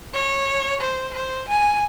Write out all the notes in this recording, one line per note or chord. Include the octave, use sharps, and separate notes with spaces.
C#5
C5
C5
G#5